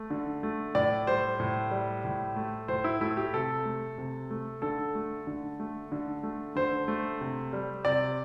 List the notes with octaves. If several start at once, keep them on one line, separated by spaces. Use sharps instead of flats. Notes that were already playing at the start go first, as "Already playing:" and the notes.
Already playing: A3
D3
A3
A2 D5
G3 C5
A2
G3
A2
A3
A2 C5
E4
A3 E4
G4
C3 A4
A3
C3
A3
D3 A4
A3
D3
A3
D3
A3
D3 C5
A3
C3
G3
C3 D5